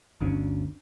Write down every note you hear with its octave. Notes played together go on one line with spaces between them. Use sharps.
G1 D2 C#4 D4